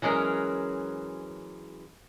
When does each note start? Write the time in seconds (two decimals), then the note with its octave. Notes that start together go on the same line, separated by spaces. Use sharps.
0.02 E3 F#3 G#3 C#4 A#4